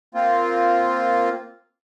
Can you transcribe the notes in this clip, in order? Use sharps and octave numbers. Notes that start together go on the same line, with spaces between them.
A#3 C4 F4